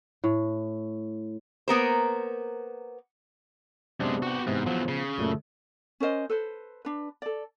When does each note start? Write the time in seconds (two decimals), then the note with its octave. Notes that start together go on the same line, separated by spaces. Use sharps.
0.24 A2
1.68 A#3 B3 A#4 C5
4.00 F#2 C3 G#3 B3 D4
4.23 F#4 G4
4.47 G#2 C3 E3
4.67 E2 F3 F#3
4.88 C#3
5.18 F#2 A#2 A3
6.00 C#4 A#4 C5 D#5
6.30 A4 B4 C5
6.85 D4 B4
7.22 A4 D5